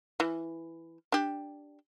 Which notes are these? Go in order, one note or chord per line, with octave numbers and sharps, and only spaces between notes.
E3
D4 G4